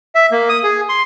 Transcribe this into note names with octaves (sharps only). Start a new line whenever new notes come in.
E5
A#3
D#6
G#4
C6